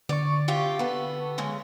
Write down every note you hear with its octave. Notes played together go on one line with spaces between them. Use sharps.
D3 D5 C#6
C3 F4 G4
B3 A4
F#2 C#3 G#3